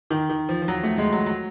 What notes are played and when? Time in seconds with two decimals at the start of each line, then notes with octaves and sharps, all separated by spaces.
0.10 D#3
0.30 D#3
0.49 F3
0.62 F3
0.68 F#3
0.83 A3
0.98 G#3
1.13 F#3
1.26 F#3